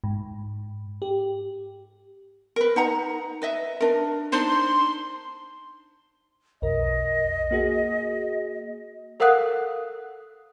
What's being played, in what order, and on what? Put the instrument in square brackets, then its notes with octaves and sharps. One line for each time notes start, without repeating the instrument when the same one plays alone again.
[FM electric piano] G#2
G4
[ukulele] A#4 B4
D#4 F#5 A#5
B4 D#5 E5
D4 A#4
[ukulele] D4 D#4 C5 [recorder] C6
[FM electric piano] B1 F2 A#4 [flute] D#5
[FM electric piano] A#3 F#4 G#4
[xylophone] A4 A#4 F5 F#5 D#6 F#6